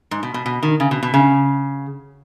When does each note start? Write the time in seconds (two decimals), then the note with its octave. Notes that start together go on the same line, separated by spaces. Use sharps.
0.11 G#2
0.23 B2
0.34 B2
0.46 B2
0.63 D#3
0.80 C#3
0.91 B2
1.03 B2
1.14 C#3